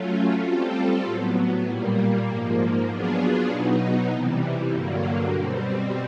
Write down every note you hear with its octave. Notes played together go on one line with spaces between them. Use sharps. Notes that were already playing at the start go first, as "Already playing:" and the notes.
Already playing: F#3 A3 C#4 F4
G3 C4 F4 A4
A2 F#3 B3
A#2 G3 A#3
G#2 F3 A#3
F#3 B3 D4 F4 G#4
B2 F#3 B3 D#4
C3 E3 G3
G2 D3 F#3 A#3
B2 G3 C4